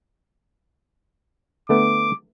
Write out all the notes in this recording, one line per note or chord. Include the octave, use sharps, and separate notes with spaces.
D3 A3 B3 D6